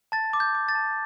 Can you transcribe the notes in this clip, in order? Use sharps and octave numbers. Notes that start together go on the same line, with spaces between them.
A5 A6
D6
G6
D6
A6
A5